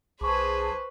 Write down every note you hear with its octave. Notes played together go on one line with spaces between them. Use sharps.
B1 G#4 B4 C5 A5 C#6 D6